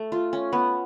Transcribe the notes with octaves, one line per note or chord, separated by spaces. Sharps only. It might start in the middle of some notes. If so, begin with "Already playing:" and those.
Already playing: A3
F4
C#4
B3